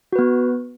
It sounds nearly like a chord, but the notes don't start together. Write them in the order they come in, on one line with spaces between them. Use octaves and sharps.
F#4 B4 B3